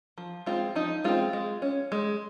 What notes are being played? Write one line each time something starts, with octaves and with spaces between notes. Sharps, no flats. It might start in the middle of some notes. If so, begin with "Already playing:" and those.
F3
G#3 C4 F4
F3 D#4
G#3 C4 F4
G#3
C#4
G#3